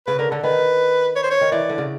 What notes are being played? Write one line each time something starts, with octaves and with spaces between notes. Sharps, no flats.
C#3 B4
D3 A#4
D3 A4
D#3 B4
C#5
C5
C#5
D#3
E3 D5
D3
C#3